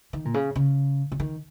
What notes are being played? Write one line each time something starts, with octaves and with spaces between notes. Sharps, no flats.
D#3
A#2
C#3
C#3
C#3
D#3